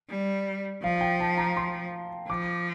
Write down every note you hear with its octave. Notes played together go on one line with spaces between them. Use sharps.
G3
F3 F5
G5
A5
A#5
C6
F3 D6